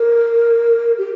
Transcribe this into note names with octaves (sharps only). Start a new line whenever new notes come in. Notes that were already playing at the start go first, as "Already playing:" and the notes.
Already playing: A#4
G4